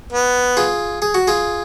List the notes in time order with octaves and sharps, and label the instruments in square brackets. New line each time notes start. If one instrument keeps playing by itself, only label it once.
[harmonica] B3
[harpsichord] F4 G#4
G#4
F#4
F4 G#4